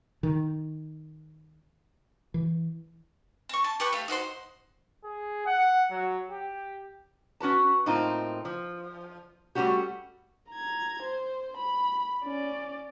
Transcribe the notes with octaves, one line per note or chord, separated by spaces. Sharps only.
D#3
E3
C4 C#6
A5
G4 B4 C#6
A3 G4 F5
D#4 F#4 C5 C6
G#4
F#5
F#3
G4
C#4 F#4 B4 A5
A2 A#3 C4 D#4 F4
F3
G3 A3 A#3 C#4 F#4 G4
A#5 G#6
C5
B5
C#4 D5